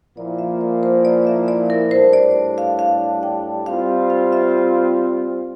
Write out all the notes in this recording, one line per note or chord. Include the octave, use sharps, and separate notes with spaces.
A#2 F3 A#3 E4 D5
E5
D5
C5
D5
E5
D5
A#4
A2 G3 D4 C5
D5
F5
F5
G5
G3 C4 F4 F5
F5
E5